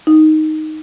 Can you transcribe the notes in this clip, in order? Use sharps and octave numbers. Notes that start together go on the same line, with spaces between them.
D#4